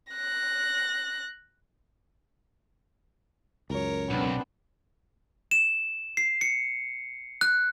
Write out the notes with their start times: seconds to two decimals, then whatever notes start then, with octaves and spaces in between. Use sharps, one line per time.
0.13 F#6 A#6
3.70 C#2 F#2 A#4 C#5
4.11 B1 B3 C4 D4
5.51 E7
6.17 C7
6.41 C#7
7.41 F#6